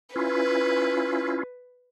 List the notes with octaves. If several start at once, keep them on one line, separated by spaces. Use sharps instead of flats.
C#4 E4 F4 B4